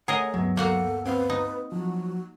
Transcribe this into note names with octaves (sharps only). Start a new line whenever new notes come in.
A3 G#4 A#4 C#5 D#5 F#5 A#5
D2 G2 F#3 B3
A#3 F#4 A4 F#5
C4 B4 F5
D#4
F3 F#3 F#4